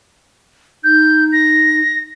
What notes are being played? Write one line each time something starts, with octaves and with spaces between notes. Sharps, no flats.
D#4 G6
A#6